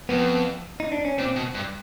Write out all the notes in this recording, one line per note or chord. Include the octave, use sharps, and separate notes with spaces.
F2 B3
D#4
D4
C#4
A#2 C4
B2
G2